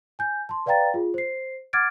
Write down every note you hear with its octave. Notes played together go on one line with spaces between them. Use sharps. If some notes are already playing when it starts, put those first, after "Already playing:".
G#5 G6
A5 C6
B4 D5 F5 G5 A#5 A6
F4 G#4
C5 C7
F#5 D6 F6 G#6 A6 D7